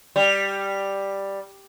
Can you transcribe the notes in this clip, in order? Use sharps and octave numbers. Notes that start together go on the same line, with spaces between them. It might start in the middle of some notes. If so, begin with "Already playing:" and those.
G3